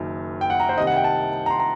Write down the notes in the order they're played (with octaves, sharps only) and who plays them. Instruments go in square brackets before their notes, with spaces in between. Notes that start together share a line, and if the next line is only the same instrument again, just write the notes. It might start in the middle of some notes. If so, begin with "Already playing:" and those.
Already playing: [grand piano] F#1 F#2 D#3
G5
F#5
A#5
C5
C2 C3 D#3 D#5
F#5
G5
A5
A#5
C6
A#5